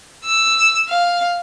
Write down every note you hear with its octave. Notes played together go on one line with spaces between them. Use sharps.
E6
F5